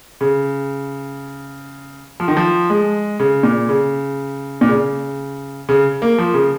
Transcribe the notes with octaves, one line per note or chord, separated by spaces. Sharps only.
C#3
F3
D#3
F3
G#3
C#3
A#2
C#3
A#2
C#3
C#3
A#3
F3
C#3